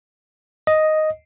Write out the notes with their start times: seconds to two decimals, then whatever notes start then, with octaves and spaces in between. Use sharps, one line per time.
0.67 D#5